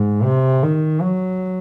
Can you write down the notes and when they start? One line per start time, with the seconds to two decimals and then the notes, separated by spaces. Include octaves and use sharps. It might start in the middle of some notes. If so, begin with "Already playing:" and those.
Already playing: G#2
0.24 C3
0.63 D#3
1.01 F#3